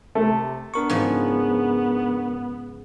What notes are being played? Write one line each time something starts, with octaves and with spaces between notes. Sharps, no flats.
C3 A3
B3 D4 A#4 C#6
G#2 C#3 F3